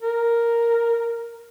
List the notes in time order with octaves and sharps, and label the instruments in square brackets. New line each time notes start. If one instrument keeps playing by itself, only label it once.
[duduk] A#4